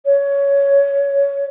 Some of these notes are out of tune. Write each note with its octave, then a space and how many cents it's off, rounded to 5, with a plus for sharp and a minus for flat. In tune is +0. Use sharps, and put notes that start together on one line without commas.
C#5 +15